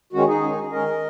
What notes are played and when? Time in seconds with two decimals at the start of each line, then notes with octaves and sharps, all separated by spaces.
0.13 D#3 G#3 C#4 F#4
0.28 D#4 G#4
0.43 D#3 G#3 C#4
0.72 D#3 G#3 C#4 A#4 D#5